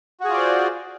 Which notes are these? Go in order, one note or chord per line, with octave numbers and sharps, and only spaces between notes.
F4 F#4 G#4 C5 D5